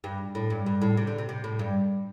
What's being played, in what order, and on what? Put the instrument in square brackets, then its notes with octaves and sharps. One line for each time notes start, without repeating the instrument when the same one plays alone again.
[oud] G2
A2
G2
G2
A2
C3
D3
C3
C3
A2
G2